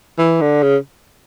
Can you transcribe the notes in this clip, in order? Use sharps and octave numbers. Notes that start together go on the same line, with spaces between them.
E3
D3
C#3